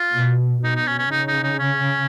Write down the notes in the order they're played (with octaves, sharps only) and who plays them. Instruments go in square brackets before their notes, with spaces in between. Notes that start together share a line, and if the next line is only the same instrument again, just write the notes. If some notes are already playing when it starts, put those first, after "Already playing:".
Already playing: [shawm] F4
[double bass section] B2
[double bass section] B2 [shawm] D#4
[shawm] D#4
C#4
C#4
[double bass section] C#3 [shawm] D#4
[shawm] D#4
D#4
C#4